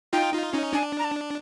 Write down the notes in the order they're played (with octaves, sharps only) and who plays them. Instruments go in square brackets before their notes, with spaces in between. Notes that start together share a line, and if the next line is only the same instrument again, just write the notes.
[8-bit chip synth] D#4 F4 [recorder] G5
[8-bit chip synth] D#4 F4
C#4 D#4
[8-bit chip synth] D4 [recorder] G#5
[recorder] A#5
A5